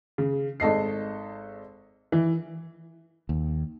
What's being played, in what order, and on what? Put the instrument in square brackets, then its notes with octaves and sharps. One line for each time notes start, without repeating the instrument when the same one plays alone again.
[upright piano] C#3
G#1 A4 D#5 C7
E3
[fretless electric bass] D#2